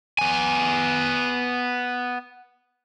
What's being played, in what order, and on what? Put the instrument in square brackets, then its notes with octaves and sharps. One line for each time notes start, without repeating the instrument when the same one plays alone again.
[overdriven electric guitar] B3 G#5